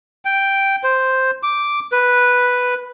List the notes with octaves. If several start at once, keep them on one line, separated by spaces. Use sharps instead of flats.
G5
C5
D6
B4